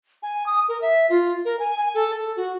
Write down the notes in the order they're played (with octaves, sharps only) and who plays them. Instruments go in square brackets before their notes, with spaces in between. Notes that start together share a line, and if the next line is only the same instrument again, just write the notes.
[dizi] G#5
D#6
A#4
E5
F4
A#4
G#5
G#5
A4
A4
F#4